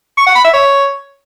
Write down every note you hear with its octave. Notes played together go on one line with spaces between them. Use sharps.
C#6
F#5
B5
E5
C#5